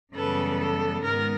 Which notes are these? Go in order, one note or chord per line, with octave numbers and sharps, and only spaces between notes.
F#2 C#3 E3 G3 B3 A4 B4
A4
G#2 D#3 G#3 B3 A#4